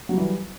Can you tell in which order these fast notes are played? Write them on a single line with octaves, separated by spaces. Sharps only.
F#3 G3 E3